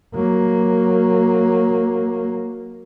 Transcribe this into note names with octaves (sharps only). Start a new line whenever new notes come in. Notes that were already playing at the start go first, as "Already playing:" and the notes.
F#3 A#3